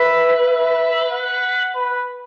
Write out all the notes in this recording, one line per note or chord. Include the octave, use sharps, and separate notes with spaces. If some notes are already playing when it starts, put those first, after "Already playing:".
Already playing: B4 E5
E5
F#5
B4